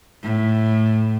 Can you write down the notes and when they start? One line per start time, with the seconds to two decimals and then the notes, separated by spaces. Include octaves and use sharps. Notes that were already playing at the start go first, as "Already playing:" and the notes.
0.23 A2